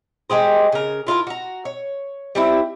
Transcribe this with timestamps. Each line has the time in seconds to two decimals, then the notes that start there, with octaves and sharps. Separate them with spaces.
0.30 G#3 G4 G#4 C5
0.72 C#3 A#4
1.07 E4 F4 A4 A#4
1.27 F#4 A#5
1.65 C#5
2.35 G3 C4 E4